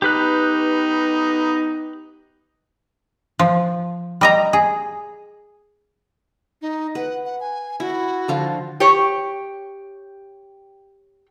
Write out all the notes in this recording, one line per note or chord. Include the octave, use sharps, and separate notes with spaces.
B3 D#4 G4 B4 F#6
F3
G3 D#5 A#5
G#4
D#4
B4 F#5
F#5
G#5
E4 F#4
D3 F3 F4
G4 C#5